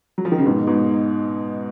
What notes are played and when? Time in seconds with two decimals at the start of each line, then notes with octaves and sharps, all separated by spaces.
0.18 F#3
0.25 F3
0.32 D#3
0.38 C#3
0.46 G#2 B2
0.67 G#2 B2